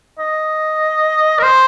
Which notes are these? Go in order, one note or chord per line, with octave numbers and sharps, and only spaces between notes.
D#5
A#4
C5